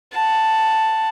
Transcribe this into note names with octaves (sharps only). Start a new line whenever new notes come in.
F#5 A5